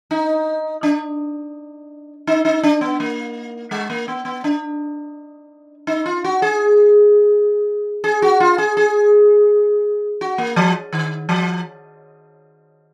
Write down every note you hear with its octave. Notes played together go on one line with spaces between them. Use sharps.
D#4
D4
D#4
D#4
D4
B3
A#3
G#3
A#3
B3
B3
D4
D#4
F4
F#4
G#4
G#4
F#4
F4
G#4
G#4
F#4
A#3
F3
D#3
F3